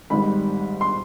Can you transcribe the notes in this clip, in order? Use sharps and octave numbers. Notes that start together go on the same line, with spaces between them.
G#1 G#2 D#3 G3 B5
C6